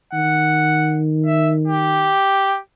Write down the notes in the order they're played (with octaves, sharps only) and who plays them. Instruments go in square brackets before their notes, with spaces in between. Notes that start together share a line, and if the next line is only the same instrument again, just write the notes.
[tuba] D#3 [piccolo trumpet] F#5
[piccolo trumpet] E5
G4